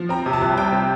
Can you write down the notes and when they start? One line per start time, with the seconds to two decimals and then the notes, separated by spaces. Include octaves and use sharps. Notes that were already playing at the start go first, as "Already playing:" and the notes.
Already playing: F3
0.09 C4 A#5
0.26 C3
0.33 A5
0.41 C2
0.57 G3 G5
0.72 C4